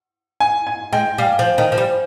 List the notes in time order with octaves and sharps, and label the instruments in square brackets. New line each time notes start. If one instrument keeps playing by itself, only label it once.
[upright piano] G#5
G#5
[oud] G#3 [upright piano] G5
[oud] G3 [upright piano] F5
[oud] F3
D#3
F3
G3